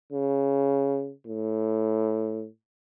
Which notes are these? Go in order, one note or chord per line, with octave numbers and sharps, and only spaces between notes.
C#3
A2